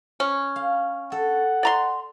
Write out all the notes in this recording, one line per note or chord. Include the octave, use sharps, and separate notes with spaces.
C#4
F5
A4 F#5
D5 A#5 C6